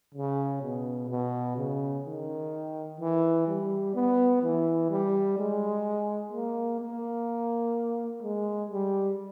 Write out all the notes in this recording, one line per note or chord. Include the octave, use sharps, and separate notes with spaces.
C#3
B2
B2
C#3
D#3
E3
G3
B3
E3
G3
G#3
A#3
A#3
G#3
G3